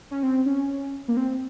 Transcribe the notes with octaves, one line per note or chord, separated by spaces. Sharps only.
C#4
C4
C#4
A#3
C4